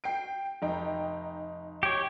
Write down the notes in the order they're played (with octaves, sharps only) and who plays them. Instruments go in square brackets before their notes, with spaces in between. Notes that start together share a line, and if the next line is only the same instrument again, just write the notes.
[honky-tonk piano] G5 C7 D7
F1 D#4 G5
[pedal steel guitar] G4 C#5